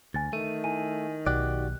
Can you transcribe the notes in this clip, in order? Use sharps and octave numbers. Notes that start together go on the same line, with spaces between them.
D2 G#5 A6
D#3 A3 D#7
E4 G#5 D#7
B1 F#4 G4 D5 F#6